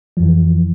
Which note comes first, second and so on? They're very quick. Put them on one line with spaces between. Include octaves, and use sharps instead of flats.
F3 F2 E3